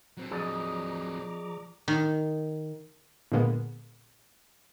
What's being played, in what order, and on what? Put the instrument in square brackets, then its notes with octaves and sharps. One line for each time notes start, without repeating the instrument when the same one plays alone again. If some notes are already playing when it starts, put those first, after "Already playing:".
[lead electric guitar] F#3 C4
[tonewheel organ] F3 A#5 D6 [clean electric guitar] G#4 D5 D#5
[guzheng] D#3
[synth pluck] A#2 D3 G#3 A#3 B3